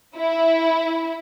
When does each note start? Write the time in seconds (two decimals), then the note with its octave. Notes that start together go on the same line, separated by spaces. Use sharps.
0.17 E4